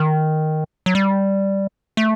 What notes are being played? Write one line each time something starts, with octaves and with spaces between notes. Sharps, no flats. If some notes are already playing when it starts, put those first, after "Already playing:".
Already playing: D#3
F#3
G3
A3